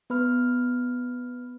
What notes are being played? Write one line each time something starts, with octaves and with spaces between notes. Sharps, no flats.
B3 B4 B5 F6